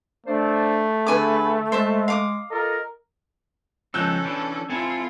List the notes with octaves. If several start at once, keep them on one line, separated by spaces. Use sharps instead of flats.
A3 D4 C5 D5
D3 D4 G#4 B4 G#5 D6
G#3 C5 E5 A5
F5 D6 D#6
F4 A4 A#4 D#5
C#2 F3 C#4 D#4 A4 E6 F#6 G6
E3 D4
C4 E4 F4 A4 G#5